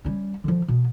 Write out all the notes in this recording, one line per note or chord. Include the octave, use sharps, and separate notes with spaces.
G3 C#4
D3 F3
B2